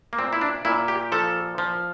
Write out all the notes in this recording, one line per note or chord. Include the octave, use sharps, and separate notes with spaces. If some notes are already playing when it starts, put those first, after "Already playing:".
A#3
A#2 C4
E4
D4
A#2 E4
G4
F3 A4
F3